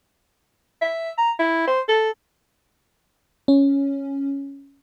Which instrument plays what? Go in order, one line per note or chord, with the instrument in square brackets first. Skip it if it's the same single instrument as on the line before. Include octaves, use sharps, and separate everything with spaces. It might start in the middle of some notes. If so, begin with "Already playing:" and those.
[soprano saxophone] E5
A#5
E4
C5
A4
[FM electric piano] C#4